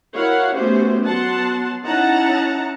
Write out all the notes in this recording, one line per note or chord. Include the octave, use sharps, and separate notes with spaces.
E4 F#4 A#4 C#5 F5 F#5
A3 B3 C#4 F#4 G4 C5
F#3 B3 F#5 A5 C6
C#4 D#4 E4 F#5 A5 A#5